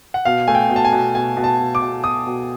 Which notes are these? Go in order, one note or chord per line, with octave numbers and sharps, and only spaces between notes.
F#5
B2 F5
A3 G#5
G5
B2
A5
G#5
B2
B2 G#5
B2
A5
B2
D6
B2
B2 D#6
B2